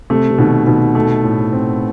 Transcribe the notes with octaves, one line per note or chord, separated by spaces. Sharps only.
C3 A3
C3
B2 D#3
B2 D#3
A3
A2
C4